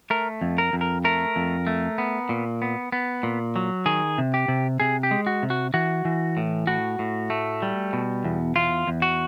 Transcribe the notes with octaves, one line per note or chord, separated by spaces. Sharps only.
A3 A#4
F2
A#4
F2
A#4
A3 A#4
F2
A3
B3
A#2
B3
B3
A#2
F#3
D#3 G#4
C3
G4
C3
C3 G#4
G4
G#3
F#4
C3
F#4
E3 F#4
E3
A2
A2 F#4
A2
A3
G3
B2
E2
E2 F4
E2
F#4